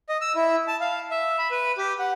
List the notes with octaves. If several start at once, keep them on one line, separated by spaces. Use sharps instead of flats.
D#5
E6
E4
A5
F5
E5
B5
B4
G4
F#5